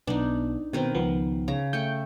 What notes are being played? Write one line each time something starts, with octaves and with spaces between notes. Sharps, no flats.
B1 B3 D4 D#4
B2 D#3 C4 A#4 B4
C#2 F3 B3
C#3 A#5
A3 G5 C#6 G6